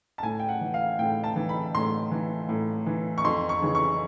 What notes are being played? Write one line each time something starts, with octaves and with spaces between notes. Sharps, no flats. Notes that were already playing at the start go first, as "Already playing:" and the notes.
A5
A2 G#5
G5
F#5
E3
F5
A2 G5
A5
E3
B5
A2 C6
E3
A2
E3
C#6
F2 C6
C#6
C#3 E3
C#6